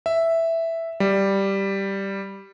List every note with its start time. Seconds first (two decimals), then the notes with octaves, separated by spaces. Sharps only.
0.06 E5
1.00 G3